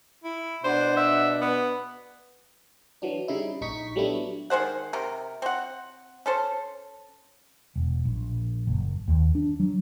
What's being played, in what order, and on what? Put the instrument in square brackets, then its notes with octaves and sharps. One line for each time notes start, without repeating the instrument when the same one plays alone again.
[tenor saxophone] E4
[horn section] B2 D4 F#5 [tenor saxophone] C5
[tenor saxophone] E5
B3
[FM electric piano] E3 F#3 D4
C#3 G3 D#4 E4
A#1 D#4 C#6 B6
F#3 G3 A3 B3 D4 E4
[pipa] D#3 G#3 C5 F#5
C3 A#4
C4 F#5
C#4 A4 C5
[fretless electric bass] E1
A#1
F#1
D#2
D4
F#3